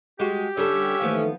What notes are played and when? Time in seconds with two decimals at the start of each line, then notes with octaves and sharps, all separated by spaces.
0.19 G#3 F#4 G4
0.57 D3 G3 C#4 A4 C#5 E5
1.02 D#2 E3 F3 A3 B3